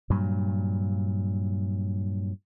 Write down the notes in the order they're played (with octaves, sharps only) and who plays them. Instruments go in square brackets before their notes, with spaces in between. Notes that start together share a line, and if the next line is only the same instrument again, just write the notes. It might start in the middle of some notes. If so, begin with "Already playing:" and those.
[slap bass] G2 A#2 F#3